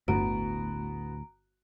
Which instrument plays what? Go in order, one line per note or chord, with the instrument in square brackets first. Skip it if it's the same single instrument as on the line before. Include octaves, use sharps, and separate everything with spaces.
[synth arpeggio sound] G1 [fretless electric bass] D2 A2 [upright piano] B3 F#4 [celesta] A#5 D7